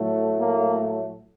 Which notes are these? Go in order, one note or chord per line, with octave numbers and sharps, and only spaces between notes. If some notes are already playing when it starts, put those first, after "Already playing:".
Already playing: A2 F#3 A3
A#3